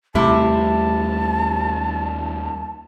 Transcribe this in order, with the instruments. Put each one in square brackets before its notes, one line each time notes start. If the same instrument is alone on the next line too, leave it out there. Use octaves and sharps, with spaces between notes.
[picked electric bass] D#2 G3 A3 [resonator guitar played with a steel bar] C3 E4 [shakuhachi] A5